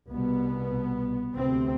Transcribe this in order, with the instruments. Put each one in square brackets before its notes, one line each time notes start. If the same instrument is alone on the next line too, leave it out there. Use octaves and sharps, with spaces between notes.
[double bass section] C2 B2 B3
D2 C3 C4